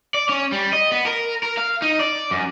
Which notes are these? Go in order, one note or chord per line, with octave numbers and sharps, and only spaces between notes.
D5
C#4
G3
D#5
B3
A#4
A#4
F5
D#4
D5
F#2